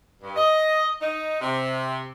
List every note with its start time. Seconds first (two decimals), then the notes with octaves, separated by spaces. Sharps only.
0.22 G2
0.36 D#5
0.99 D#4
1.40 C3